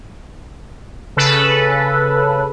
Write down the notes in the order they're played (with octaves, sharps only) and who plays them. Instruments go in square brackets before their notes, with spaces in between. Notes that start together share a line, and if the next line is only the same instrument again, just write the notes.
[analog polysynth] C#3 A4 B4